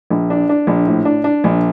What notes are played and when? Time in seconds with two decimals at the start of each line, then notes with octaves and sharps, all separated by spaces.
0.10 A#1
0.30 D4
0.49 D4
0.67 A#1
0.87 A2
1.05 D4
1.24 D4
1.44 A#1